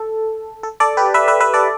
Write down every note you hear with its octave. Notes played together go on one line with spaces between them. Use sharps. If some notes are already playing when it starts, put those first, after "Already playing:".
Already playing: A4
A4
A4 D5
G4 B4
B4 E5
B4 E5
B4 E5
A4 D5